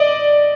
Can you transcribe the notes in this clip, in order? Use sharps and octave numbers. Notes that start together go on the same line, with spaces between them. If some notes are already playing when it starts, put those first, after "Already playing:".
Already playing: D5 D#5